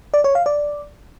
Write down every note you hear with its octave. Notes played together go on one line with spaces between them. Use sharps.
D5
C#5
F5
D5